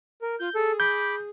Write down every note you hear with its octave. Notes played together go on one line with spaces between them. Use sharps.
A#4
F4 G6
G#4 A4
B5 D6 G6